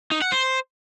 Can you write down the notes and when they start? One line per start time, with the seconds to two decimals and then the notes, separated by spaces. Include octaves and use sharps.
0.11 D#4
0.22 F#5
0.32 C5